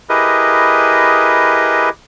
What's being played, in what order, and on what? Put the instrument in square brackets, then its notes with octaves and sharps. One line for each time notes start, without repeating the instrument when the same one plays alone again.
[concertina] E4 G4 G#4 A#4 B4 D#5